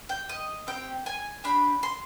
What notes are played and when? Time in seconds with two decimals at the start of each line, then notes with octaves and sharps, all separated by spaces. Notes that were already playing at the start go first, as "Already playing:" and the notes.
0.09 G5
0.29 D#5
0.67 C4 D#4 G4 G5
1.06 G#5
1.44 D4 G4 B5
1.83 C6